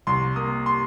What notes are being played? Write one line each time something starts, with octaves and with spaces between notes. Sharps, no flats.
C2 C6
A#3 D#6
C6